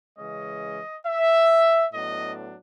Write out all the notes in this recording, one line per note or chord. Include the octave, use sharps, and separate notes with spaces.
C#3 E3 G#3 C#4 D#5
E5
A2 F#3 B3 D4 D#5